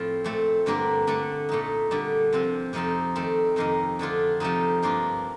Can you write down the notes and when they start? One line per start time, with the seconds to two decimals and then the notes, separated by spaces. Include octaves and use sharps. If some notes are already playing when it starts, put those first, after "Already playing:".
Already playing: A2 F3 C4 F4
0.24 A#2 A3 C4
0.66 G2 D3 G3 A#3 D4
1.07 D3 A3 D4
1.49 A#2 A3 D#4
1.91 D3 G3 D4
2.33 C3 F3 C4
2.73 F2 C3 F3 C4 D#4
3.16 D#3 A3 C4
3.56 F2 C3 D#3 A#3 D#4
3.99 D3 A3 D4 F4
4.40 C3 F3 A3 C4 D#4
4.82 G2 F3 A#3 D4 F4